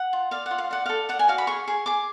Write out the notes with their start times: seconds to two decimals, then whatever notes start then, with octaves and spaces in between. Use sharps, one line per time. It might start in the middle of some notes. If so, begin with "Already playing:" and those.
Already playing: F#5
0.13 F4
0.31 D5 F5
0.46 F#5
0.51 F4
0.58 F5
0.71 D5 F#5
0.86 A4 F5
1.09 D5 F#5
1.19 G#5
1.28 F#4 F5
1.38 B5
1.47 G#4 C#6
1.68 G#4
1.86 G#4 D6